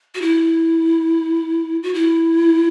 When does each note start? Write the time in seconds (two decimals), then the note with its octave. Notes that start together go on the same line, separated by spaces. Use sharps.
0.15 F#4
0.22 E4
1.83 F#4
1.94 E4